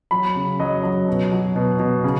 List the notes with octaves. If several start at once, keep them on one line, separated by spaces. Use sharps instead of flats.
F#3 B5
C#3
F#3 D#5
F#3
B2
F#3
B2
B2
C#3